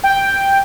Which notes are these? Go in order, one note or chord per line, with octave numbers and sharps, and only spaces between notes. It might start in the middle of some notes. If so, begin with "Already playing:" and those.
G5